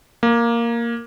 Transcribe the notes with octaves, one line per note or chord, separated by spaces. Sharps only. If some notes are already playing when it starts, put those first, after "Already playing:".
A#3